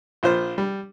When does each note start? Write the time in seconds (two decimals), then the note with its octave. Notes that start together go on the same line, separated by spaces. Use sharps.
0.23 A#1 F4 C5
0.58 G3